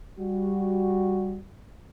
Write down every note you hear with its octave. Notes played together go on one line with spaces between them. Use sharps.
G3 F#4